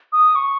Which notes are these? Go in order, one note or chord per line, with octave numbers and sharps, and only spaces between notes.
D#6
C#6